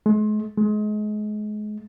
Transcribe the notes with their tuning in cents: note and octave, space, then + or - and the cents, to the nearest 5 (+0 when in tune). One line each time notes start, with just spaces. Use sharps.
G#3 +40
G#3 +30